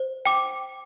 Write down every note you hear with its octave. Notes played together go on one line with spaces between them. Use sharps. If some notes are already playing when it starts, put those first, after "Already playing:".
Already playing: C5
G5 D6